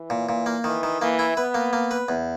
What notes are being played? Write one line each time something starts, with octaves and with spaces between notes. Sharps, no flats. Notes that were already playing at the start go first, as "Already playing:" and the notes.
Already playing: E3
A#2
A#2
A#3
D#3 E3
D#3
E3 A#3
E4
B3 B4
A#3
A#3
B4
E2